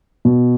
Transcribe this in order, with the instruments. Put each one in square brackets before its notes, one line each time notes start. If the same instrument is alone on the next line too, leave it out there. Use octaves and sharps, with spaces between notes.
[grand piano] B2